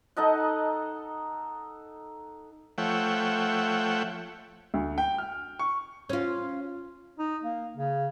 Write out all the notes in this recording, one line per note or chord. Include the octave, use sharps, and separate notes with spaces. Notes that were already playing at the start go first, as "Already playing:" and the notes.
D#4 A4 D#5 F#5
F3 A3 C#5 E5 F#5 G5
D2
G5
F6
C#6
C#4 F4
D#4
A#3
C#3